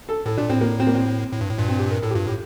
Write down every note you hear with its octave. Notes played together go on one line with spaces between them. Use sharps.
A4
A2 A4
A#2 D4
A2 C4
A#3
C4
A#3
C4
A2
G2
A2
G2 A#2
C4
G4
A#4
A2 A4
G4
G2 F4
A2 G4